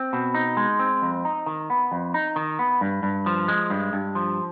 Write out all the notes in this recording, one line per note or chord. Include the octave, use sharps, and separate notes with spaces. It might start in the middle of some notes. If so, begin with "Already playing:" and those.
Already playing: C4
B2
D#4
G#3
C4
F2
D#4
D#3
B3
F2
D#4
D#3
B3
G2
G2
F3
G#3
G2
G2
F3